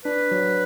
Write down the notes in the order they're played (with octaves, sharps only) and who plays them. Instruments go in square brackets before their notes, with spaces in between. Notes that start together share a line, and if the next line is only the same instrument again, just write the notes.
[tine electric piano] D4 [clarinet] B4
[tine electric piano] F#3